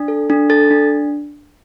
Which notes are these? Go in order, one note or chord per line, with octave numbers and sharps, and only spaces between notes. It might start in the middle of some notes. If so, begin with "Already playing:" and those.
Already playing: D4
A4
D4
A4 A6
D4